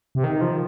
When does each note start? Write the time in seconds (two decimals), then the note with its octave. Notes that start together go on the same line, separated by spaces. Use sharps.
0.15 C3
0.24 D#3
0.41 F3